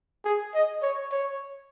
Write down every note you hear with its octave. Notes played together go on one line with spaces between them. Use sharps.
G#4
D#5
C#5
C#5